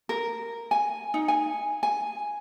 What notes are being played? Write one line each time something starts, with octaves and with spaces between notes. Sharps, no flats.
A#4
G#5
D#4
G#5
G#5